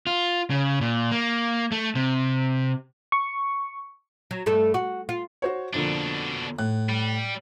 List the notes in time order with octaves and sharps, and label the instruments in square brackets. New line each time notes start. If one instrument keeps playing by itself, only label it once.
[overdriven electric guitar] F4
C#3
A#2
A#3
A3
C3
[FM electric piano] C#6
[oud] F#3
G2 A3 A4
F#4
F4
[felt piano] F#4 C5 C#5
[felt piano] F2 D3 A#3 [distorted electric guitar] B2 D4
[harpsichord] A2 [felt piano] F#6
[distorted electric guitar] G3